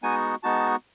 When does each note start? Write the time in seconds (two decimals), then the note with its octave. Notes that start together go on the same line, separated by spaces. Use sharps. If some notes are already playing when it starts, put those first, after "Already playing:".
0.03 G#3 B3 D#4 F#4 G#5
0.43 G#3 B3 D#4 F#4 A5